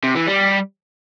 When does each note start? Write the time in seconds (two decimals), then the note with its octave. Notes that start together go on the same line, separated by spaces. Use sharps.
0.03 C3
0.15 E3
0.27 G3